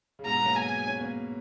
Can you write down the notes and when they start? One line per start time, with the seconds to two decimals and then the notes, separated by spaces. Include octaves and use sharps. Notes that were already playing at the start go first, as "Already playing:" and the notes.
0.19 C#3
0.25 G#2 B2 A#5
0.38 B3
0.46 F#3 A#3
0.56 G#5
0.87 C#4
0.95 B3
1.01 A#3 C#4